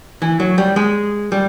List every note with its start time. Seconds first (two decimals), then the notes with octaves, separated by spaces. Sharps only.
0.22 E3
0.40 F#3
0.58 G3
0.76 G#3
1.32 G3